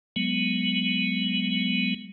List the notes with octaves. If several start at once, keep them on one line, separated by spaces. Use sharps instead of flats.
F#3 G#3 B3